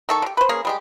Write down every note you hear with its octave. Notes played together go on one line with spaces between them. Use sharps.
D#3 A4 C#6
D3 G4
B4 C5
A#3 C#4 G#4
G3 G#3 G4